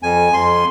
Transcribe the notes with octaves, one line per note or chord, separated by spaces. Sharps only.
F2 G#5
F2 C6